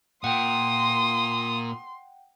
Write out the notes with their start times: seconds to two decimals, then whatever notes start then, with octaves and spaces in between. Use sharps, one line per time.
0.24 A#2 F#5 G5 C6 D#6